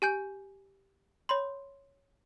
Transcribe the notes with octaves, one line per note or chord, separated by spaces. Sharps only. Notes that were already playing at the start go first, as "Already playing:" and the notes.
G4 G#5 G6
C#5 B5 C6